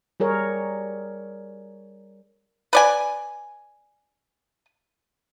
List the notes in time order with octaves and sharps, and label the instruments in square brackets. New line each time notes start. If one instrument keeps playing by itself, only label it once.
[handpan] G3 G#4 A#4 C#5
[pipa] B4 D5 G#5